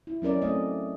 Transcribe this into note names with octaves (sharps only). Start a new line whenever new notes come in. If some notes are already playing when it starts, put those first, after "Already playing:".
E4
F#3 C#4 A#4 D5
A3 C4 D#5